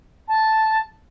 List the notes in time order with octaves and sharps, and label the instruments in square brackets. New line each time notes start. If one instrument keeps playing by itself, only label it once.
[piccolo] A5